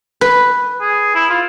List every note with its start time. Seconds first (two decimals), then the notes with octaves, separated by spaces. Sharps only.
0.21 B4
0.81 G#4
1.15 E4
1.30 F4